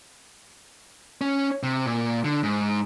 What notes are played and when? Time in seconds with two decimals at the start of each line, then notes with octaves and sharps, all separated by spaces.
1.21 C#4
1.63 C3
1.86 A#2
2.24 D3
2.43 G#2